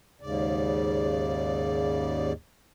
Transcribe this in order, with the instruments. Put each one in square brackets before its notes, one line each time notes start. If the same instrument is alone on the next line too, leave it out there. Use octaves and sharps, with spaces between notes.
[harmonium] D#2 G#2 C#3 D5